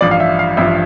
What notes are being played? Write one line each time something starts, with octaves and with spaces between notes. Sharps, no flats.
A1 G2 F3 D5
F5
E5
F5
A1 G2 F3 E5